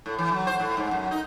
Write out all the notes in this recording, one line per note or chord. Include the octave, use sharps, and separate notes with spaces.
A2
E3
F#3
C5
A2
G#2
F#2
D#4